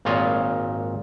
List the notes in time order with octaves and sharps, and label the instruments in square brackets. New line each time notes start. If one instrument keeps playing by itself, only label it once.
[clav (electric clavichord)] G#1 A#2 F4 C#5 D#5